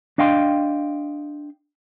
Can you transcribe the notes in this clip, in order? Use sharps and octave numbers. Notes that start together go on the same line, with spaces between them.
D4 D#5 F5 G5 C6